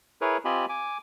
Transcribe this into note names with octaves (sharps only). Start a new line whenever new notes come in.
E4 G#4 A#4 B4 C#5
C4 F4 G4 D#5 G#5 B5
G#5 D6